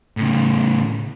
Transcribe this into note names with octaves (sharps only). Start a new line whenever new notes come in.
A2 C#3